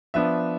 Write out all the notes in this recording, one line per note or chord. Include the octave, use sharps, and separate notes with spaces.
F3 B3 D4 E5